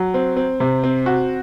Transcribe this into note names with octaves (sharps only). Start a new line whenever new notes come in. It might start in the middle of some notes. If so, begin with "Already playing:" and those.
Already playing: F#3
C4
C4
C3
C4
F#4